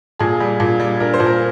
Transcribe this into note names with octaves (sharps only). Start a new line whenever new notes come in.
A#2 G#4
G3
A#2
G3
D4 A#4
C5
A#2
A#4